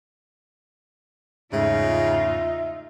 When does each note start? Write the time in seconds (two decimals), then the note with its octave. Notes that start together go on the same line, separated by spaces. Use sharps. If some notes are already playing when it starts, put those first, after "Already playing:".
1.52 E2 G#2 C#3 A3 D#4 F4 E5